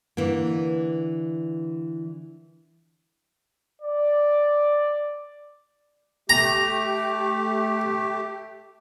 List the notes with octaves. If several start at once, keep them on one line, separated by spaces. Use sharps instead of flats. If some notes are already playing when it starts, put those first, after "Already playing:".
D3 E3 A#3
D5
A3 G4 A#5